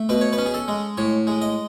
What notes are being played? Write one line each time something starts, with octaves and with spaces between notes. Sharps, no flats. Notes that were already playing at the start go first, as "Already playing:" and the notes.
Already playing: A3
B2 B4
C#5
B4
C#4
G#4
A4
G#3
A2 C#5
G#3
D#5